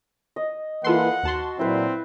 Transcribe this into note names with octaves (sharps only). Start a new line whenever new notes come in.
D#5
E3 A#3 F4 A4 B4 F#5 C6
D#2 F#4 A5 C6
A#2 F#3 C4 E4 B4